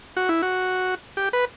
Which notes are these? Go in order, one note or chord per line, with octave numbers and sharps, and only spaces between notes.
F#4
E4
F#4
G4
B4